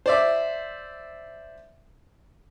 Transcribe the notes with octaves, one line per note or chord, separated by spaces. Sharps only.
C5 D5 E5